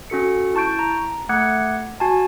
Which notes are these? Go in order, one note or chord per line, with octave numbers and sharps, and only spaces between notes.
C#4 F#4 A4 C#7
E4 A5 C#6 G6 D7
A#5
A3 F#5 D6 F#6 G#6 C#7
F#4 G#5 A5